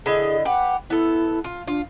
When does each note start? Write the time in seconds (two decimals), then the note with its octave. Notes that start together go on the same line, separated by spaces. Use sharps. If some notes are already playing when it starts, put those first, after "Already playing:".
0.06 D3 E4 G#4 D#5
0.45 G4 B4 F#5
0.90 B3 E4 A4
1.44 F4
1.67 D4 F4